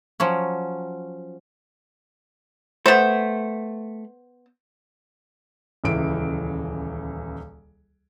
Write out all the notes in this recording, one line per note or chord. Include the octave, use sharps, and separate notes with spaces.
F3 F#3 C#4
A3 B3 C5
D#1 C#2 E3 D7